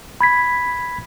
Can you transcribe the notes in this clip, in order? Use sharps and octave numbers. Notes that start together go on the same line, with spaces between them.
B5 G#6 B6